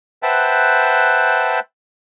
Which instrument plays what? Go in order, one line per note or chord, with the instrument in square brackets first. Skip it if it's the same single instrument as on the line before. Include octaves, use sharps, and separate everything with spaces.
[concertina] B4 C5 E5 F#5 G5 A5